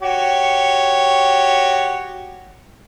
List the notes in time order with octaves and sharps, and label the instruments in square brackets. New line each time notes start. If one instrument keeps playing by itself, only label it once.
[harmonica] F#4 G4 C#5